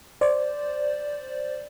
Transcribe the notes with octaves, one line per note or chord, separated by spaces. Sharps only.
C5 D5